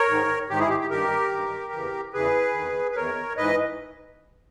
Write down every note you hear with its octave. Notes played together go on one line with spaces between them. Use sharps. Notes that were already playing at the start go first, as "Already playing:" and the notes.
Already playing: A#4 C#5
G#2 D#3
G#2 D#3 G4
E4 G#4
G4
G4
G2 D#3 G4 A#4
G2 D#3
E2 C#3 E3
E2 C#3 E3 G#4 B4
E2 D#3
B4
E2 D#3 A#4 C#5
G#2 E3 B4 D#5